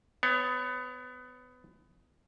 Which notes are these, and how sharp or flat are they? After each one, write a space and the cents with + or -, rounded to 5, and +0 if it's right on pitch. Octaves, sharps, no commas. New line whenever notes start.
B3 +25 C#5 +0